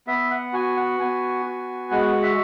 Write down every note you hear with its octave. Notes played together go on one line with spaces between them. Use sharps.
B3 E5
F#5
F#4 G#5
F#5
B3 G#5
F#4
G#3 F#5
E5